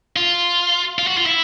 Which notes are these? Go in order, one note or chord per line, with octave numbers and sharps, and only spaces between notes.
F4
F4
F#4
F4
E4